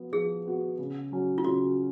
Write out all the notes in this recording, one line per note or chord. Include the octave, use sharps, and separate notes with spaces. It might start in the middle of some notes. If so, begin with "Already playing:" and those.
Already playing: F3 B3 F#4
F3 G#4
B3 F#4
C#3
F#3 C#4 F#4
F4
C#3 F#4